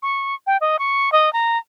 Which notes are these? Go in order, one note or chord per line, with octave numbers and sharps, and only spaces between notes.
C#6
G5
D#5
C#6
D#5
A#5